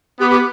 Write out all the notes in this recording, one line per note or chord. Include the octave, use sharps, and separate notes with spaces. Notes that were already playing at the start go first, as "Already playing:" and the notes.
B3 G4
G4